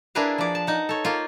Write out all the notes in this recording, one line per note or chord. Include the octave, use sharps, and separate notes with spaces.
D4 E4 G#4 A#4 B4 F5
F3 D5
A5
D#4 F#5
A4 C#5
A#3 F4